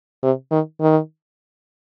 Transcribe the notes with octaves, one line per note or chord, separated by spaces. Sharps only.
C3
D#3
D#3